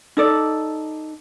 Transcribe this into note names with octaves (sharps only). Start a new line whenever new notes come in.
D#4 A4 D5